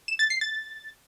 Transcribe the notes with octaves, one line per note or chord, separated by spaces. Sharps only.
E7
A6
C7
A6